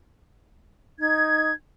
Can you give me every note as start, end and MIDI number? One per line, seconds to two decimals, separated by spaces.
1.00 1.51 63
1.00 1.51 92